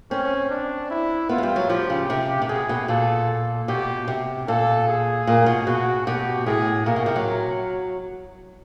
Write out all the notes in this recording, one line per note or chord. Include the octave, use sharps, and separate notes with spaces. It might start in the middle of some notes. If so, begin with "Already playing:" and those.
C4 C#4
D4
E4
B3 F4
G#3
G3
F#3
F3 G4
C#3
C3
C3
B2 G#4
B2
A#2 A4
B2 G4
C3
A#2 A4
G#4
A#2
B2
B2 F#4
B2 G4
A2 G#4
A#2 A#4
B2
C3
F#3